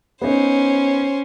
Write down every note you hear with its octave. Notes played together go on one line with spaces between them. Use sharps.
B3 C#4 D#4 C5